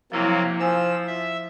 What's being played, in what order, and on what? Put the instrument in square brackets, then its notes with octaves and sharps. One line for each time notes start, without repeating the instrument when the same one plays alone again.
[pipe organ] C3 F#3 A#3 [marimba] F3 E4
[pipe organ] F3 E6 [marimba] C5 F5 G#5
[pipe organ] E5